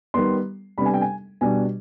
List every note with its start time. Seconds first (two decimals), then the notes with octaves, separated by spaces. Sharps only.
0.14 D#3 G3 B3 C6
0.78 C3 G3 B3 D4 B5
0.85 G#5
0.94 G5
1.01 G#5
1.41 B2 G3 D4 G#5